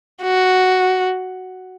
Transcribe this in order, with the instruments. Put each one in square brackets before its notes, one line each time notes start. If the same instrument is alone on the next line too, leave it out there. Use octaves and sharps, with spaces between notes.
[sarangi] F#4